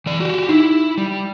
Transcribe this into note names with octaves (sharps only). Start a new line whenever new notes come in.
E3 D5
F#4 G4
D#4 E4
G3